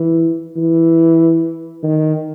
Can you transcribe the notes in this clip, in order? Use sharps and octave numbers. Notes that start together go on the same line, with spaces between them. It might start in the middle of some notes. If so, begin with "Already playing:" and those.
Already playing: E3
E3
D#3